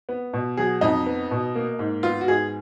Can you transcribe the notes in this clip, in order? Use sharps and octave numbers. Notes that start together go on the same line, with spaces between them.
B3
B2
F#3 G#4
F2 D#4
B3
B2
A#3
G#2
B3 F4
F#4
G#2 G#4